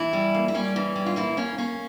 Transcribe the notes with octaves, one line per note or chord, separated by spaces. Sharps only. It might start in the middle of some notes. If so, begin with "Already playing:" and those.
Already playing: E3 E4
G3
A#3
E4
G3 C#4
E3
G3
F4
E3 A#3 E4
A#3 C#4
A#3 C#4